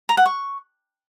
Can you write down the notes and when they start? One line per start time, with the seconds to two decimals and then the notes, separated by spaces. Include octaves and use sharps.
0.09 A#5
0.17 F#5
0.26 C#6